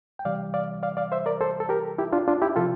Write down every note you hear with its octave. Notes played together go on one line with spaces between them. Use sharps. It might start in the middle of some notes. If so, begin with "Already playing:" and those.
G5
C3 E3 G3 D5 F5
D5 F5
D5 F5
D5 F5
C5 E5
A#4 D5
A4 C5
A4
G4 A#4
E4 G4
D4 F4
D4 F4
E4 G4
C3 F3 F4 A4